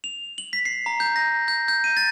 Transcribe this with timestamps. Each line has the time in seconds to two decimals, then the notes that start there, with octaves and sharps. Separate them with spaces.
0.04 F7
0.38 F#7
0.53 B6
0.65 C7
0.86 A#5
1.00 G6
1.16 A#6
1.48 G6
1.68 G6
1.84 D#7
1.97 A6